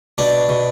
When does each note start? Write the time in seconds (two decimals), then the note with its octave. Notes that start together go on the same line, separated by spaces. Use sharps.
0.18 B2 D4
0.49 B2